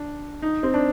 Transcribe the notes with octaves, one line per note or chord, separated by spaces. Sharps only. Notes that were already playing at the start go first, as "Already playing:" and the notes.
Already playing: D4
D#4
C4
D4